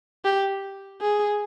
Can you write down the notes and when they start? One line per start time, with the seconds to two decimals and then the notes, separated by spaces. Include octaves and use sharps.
0.25 G4
1.01 G#4